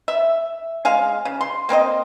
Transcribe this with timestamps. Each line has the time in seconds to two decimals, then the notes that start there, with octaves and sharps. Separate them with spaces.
0.08 E5
0.85 G#3 G#4 F5
1.25 C#3
1.41 C6
1.69 A#3 C4 A#4 D#5